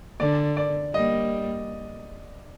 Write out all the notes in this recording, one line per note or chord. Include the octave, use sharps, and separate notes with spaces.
D3 D5
D5
G3 A#3 D#5